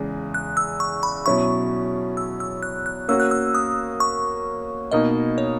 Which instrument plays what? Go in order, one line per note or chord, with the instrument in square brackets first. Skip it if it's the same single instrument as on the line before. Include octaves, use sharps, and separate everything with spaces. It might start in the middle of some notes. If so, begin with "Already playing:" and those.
Already playing: [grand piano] E2 C#3 G#3
[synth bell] F#6
E6
C#6
B5
[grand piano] B2 F#3 C#4 E4 [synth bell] C#6
[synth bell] E6
E6
F#6
F#6
[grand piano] A#3 C#4 F#4 [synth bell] E6
[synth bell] F#6
E6
D#6
C#6
[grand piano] B2 A#3 D#4 A#4 [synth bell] D#5
[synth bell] C#5